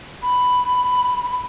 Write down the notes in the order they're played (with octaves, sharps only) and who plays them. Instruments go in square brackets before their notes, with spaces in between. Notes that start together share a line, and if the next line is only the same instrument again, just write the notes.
[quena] B5